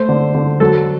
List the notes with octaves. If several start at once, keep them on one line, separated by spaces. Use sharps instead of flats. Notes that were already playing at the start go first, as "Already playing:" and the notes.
Already playing: A3 C5
D3
D3
F#3 A4